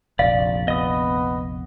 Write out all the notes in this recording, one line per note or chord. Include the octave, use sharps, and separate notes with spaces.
F1 A#1 D5 F5
B3 D#5 D#6